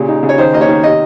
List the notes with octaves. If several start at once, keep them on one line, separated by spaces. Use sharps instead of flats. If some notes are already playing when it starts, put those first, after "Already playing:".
Already playing: A#2 C#3 G4
D#4
C#3
C#5
D#3 C5
A#3 D#5
C#5
D#3
C3 D#5